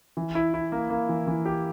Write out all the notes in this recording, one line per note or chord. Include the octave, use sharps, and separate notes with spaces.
E3
E4
E4
A#3
A#3
E3
E3
G4